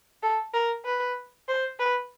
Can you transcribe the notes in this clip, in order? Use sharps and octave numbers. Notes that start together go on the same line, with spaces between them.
A4
A#4
B4
C5
B4